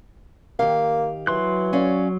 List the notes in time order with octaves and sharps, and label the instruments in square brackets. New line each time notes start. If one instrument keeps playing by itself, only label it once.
[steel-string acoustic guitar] D#3 G4 F5 [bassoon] A#3
[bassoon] E3 [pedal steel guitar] F#3 C6 F#6
[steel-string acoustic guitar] C#4 D5 F5